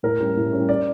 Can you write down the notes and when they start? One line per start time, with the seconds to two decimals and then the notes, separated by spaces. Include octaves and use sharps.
0.03 A2 A#4
0.20 G3 C#4
0.36 A2
0.53 G3 C#4
0.69 D5